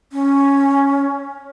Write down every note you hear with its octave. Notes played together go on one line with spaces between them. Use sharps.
C#4